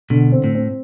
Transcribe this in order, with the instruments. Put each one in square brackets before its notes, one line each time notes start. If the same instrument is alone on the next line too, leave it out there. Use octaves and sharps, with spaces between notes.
[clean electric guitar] B1 B2 [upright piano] D3
[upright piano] C4
[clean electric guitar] A2
[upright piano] C4